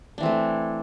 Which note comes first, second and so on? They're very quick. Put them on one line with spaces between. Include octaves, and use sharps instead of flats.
D4 E3 C4 A3